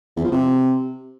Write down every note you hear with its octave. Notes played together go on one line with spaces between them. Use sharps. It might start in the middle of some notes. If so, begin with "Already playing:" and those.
E2
F3
C3